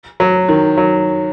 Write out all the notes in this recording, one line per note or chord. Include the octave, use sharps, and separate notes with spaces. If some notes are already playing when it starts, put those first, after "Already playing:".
F#3
D#3
F#3